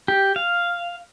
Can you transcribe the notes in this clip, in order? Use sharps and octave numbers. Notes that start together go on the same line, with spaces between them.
G4
F5